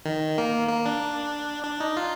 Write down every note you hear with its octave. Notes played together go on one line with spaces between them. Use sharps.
D#3
A#3
A#3
D4
D4
D#4
F4